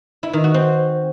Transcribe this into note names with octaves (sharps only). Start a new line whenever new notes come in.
E4
D#3
F#4
C4